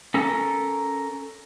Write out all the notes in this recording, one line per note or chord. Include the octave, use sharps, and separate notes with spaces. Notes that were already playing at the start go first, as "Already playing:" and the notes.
C#4 A4 A#4